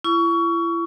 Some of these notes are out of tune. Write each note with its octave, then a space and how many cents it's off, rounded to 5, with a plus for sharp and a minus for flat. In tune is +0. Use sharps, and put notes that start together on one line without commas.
E4 +35 C#6 +25